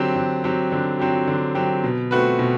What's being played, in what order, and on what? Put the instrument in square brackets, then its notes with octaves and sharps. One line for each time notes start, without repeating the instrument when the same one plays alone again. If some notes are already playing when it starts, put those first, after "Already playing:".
Already playing: [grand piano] D3 F#3 C4 G4
D3
F#3 C4 G4
D3
F#3 C4 G4
D3
F#3 C4 G4
B2
A3 C4 F#4 B4
B2